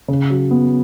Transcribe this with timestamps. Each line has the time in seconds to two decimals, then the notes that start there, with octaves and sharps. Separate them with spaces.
0.08 C#3
0.30 F#3
0.51 B3